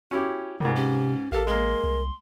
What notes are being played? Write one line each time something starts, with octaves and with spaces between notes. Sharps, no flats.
C#4 E4 F#4 G4
C#2 G#2 C3 A#4
C#4 G4
A1 G4 A4 A#4 F5
G#3 A#3 C6
C2